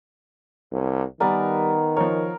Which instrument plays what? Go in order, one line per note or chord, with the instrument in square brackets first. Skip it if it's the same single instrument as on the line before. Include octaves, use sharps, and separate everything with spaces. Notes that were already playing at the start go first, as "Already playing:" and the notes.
[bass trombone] C2
[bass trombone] D#3 [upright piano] G3 D5 G#5 [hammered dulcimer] B3 A#4
[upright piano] F3 C#5 [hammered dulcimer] A#4